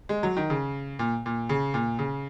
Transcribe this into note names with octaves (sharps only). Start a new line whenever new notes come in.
G#3
F#3
D#3
C#3
A#2
A#2
C#3
A#2
C#3